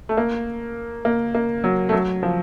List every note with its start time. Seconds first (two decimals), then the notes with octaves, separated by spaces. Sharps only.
0.09 A3
0.17 A#3
1.05 A#3
1.35 A#3
1.64 F#3
1.89 A3
1.92 F#3
2.23 F3